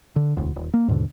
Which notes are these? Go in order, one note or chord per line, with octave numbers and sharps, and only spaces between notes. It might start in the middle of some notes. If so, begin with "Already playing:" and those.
D3
E1 D2
D#1
A#3
D#2 G#2 B2 D3